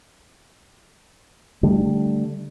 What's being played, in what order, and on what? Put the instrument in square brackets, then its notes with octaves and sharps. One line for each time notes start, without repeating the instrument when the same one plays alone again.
[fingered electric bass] D3 G3 A3